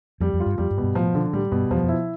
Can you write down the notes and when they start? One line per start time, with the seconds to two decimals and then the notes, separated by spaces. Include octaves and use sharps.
0.20 F2 G3
0.34 F2
0.40 F4
0.46 G2
0.58 F2 G3
0.71 G2
0.78 B2
0.83 G2
0.95 A2 F3
1.14 B2 D3
1.33 A2 G3
1.52 G2 B2
1.70 E2 F3
1.83 F2
1.89 E4